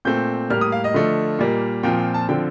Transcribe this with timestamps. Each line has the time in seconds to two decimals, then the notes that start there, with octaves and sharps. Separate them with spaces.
0.05 A#2 A3 C4 G6
0.50 A2 G3 A#3 F6
0.61 D#6
0.72 F5
0.84 D#5
0.94 D3 F3 A3
1.39 A#2 G3 A#3
1.83 A#2 F3 C4 G5
1.99 G5
2.14 A5
2.29 D3 F3 C4 G5